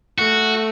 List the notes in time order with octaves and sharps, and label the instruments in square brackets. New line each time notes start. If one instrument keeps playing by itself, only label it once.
[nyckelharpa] A3 [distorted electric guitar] F#4